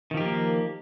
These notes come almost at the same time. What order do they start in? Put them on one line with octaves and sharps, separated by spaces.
D#3 F3 G4 A#3